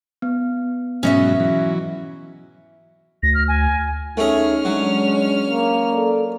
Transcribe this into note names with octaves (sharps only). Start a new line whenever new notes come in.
B3
G#2 B2 F#3 C#4 D#5 E5
E3 F#3
D2 A#6
F6
G#5
A3 C#4 D#4 G#4 F6
F#3 G#3 D4
A#3
A4 D5